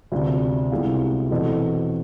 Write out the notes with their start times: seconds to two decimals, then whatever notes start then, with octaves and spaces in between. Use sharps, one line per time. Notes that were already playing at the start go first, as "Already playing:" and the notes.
0.12 D2 C3 G#3 D4 F4
0.72 C2 C3 G#3 B3 F4
1.31 E2 B2 A3 C4